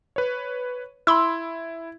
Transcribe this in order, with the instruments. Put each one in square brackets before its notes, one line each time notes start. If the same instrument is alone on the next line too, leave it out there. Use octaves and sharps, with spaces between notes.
[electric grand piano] B4 C#5
[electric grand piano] E4 [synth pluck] B5 C6 E6